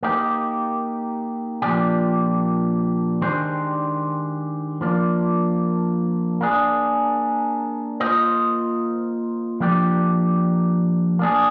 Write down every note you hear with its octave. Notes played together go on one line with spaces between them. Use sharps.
A#3 D#4 G4
A#2 F3 A#3 D4 G4
D#3 G#3 D4 G4 C5
F3 A#3 D4
A#3 D4 G#4
A#3 F4 C5 D#5
F3 A#3 D4 G4 D5
A#3 D4 G#4